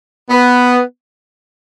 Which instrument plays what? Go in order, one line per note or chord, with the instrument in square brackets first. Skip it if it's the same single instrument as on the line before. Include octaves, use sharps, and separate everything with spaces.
[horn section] B3